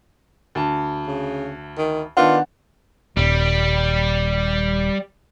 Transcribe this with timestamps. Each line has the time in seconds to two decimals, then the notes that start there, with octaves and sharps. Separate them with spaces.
0.55 D2 A5
1.07 C#3
1.78 D#3
2.17 D#3 B3 D4 F4 F#5
3.17 D#1 G3